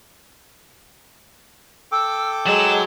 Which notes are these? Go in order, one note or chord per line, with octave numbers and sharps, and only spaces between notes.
A4 G5 D6 E6
F#3 G#3 E7